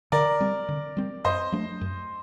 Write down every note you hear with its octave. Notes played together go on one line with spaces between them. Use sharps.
D3 A#4 D5
G3 C4
D3
G3 C4
F#2 C5 D#5
F#3 A3 D4
F#2